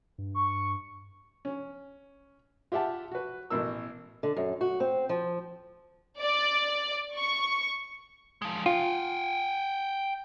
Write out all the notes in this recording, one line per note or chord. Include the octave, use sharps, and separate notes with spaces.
G2
C#6
C#4
F4 G4 E5 F#5 A5
F#4 B4
A1 B2 A#4 E6
D3
F#2
F#4
C4
F3
D5
C#6
F3 G#3
F4 F#5 G5